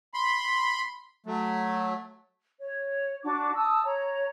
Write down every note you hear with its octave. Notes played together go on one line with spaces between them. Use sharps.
B5 C6
F#3 A3
C#5
D4 F#4 D6
A5 D#6 E6
C#5 A#5